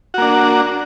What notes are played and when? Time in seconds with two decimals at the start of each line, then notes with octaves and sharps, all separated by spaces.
0.14 F#4
0.18 A#3
0.22 D4